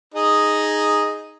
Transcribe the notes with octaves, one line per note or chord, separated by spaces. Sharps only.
D#4 G#4